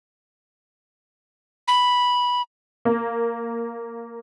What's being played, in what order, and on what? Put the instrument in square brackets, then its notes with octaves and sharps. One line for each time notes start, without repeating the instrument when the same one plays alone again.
[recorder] B5
[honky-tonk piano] A#3